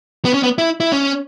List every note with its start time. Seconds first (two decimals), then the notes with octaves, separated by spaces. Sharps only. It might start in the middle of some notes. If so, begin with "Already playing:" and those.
0.25 B3
0.34 C#4
0.43 B3
0.58 E4
0.80 E4
0.92 C#4